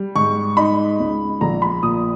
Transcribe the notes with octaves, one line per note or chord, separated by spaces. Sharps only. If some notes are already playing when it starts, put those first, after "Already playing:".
Already playing: G3
G#2 C#6
D#4 B5
C#2
A#1 A#5
B5
A#2 D#6